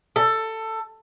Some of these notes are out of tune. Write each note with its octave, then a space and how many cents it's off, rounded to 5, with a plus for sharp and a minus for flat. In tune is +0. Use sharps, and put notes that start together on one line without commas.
A4 +15